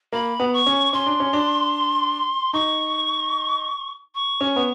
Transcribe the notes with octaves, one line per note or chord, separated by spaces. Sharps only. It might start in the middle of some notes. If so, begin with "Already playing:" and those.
A#3 B5
B3
C#6
C#4
C#4 C6
D4
C#4
D4
D#4 C#6
C#6
C#4
B3